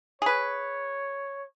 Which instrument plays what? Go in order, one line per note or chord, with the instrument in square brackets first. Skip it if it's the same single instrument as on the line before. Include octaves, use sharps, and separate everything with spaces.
[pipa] G#4 B4 [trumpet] C#5